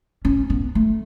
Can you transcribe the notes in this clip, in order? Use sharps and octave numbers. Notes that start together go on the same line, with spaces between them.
C#4
B3
A3